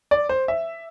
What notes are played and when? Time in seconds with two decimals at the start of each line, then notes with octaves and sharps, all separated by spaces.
0.11 D5
0.29 C5
0.48 E5